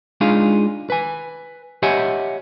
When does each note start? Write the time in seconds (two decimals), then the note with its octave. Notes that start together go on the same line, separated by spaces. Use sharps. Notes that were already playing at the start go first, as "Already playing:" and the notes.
0.21 G#3 D4 D#4 F4 G#4 F5
0.90 B4 G#5
1.83 G4 C#5 D#5 E5 F#5 G#5